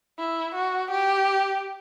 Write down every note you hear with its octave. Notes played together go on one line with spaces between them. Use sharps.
E4
F#4
G4